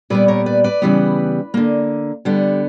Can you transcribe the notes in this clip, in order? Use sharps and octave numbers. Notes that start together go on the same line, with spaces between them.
A#2 G3 B3 B4 D5
A#4 C#5
B4 D5
B4 D5
C#3 E3 G3 B3
D3 A#3
D3 G3 B3